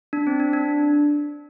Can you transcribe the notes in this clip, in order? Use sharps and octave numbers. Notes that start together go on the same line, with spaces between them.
D4
C4
D4
D4